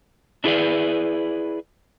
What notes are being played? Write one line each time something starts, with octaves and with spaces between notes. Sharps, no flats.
D4 E4 G#4 A4 B4 D5